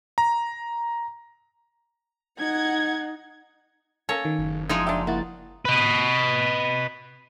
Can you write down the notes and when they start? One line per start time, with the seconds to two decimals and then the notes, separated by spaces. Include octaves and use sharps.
0.18 A#5
2.39 D#4 F#5 G#6
4.09 A#3 C#4 A4 C#5
4.25 D#3
4.39 F#1
4.69 F3 G#3 D#4 E4 G#6
4.87 D4 G4 E5
5.07 A#3 E4 F#4 A6
5.65 B4 D#5